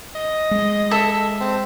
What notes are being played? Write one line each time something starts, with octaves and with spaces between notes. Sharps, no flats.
D#5
G#3
A4 E5
C4